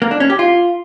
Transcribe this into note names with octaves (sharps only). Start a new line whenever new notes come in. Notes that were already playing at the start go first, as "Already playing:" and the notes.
A#3
D4
C#4
G4
F4